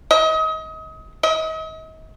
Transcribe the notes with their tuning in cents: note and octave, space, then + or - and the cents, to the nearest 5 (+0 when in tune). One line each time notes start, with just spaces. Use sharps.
D#5 +30
D#5 +40